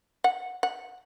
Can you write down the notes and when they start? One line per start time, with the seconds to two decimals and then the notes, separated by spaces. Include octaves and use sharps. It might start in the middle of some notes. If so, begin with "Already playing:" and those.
0.24 F#5
0.63 F#5